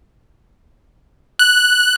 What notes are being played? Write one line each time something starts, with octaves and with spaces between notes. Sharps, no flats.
F#6